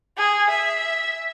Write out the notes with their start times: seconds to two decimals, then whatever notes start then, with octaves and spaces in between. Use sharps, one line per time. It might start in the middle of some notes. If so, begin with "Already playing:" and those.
0.17 G#4
0.50 E5